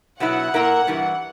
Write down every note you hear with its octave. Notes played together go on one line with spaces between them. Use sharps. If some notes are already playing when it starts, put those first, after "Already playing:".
B2 F#3 B3 E4 F#5
A#2 A#3 E4 A#4
G2 E3 G3